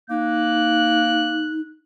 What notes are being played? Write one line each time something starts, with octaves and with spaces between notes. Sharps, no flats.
A#3 D#4 F#6